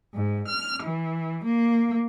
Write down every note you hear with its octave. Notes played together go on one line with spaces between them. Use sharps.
G#2
F6
E3
A#3